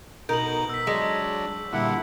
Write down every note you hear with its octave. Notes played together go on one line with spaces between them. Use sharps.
B2 D#4 A#4 G6 F#7
E6 B6
F#3 G#3 D4
A#2 D3 G3 E4 F#5